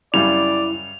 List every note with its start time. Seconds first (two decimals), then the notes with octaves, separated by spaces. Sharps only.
0.14 F#2 C#3 G3 E4 D5 F7